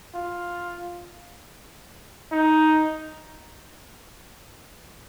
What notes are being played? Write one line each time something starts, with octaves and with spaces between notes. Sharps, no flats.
F4
D#4